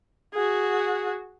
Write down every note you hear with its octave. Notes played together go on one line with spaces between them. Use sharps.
F#4 G#4